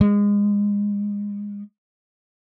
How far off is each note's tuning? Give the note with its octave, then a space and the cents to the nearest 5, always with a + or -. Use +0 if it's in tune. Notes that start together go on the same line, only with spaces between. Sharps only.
G#3 -25